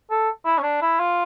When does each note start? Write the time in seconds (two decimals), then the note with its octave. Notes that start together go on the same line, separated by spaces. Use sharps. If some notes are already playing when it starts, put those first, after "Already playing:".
0.11 A4
0.46 E4
0.58 C#4
0.63 D4
0.82 E4
1.00 F4